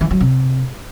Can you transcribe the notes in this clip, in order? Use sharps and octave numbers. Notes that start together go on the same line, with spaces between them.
E3
F#3
C3